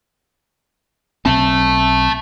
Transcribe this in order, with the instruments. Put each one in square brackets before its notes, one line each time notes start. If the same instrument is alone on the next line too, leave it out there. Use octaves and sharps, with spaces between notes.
[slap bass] B1 C4 [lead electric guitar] E5 A5